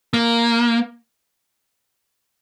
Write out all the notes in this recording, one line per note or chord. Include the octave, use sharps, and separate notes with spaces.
A#3